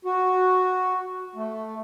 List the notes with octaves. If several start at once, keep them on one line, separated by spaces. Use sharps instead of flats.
F#4
A3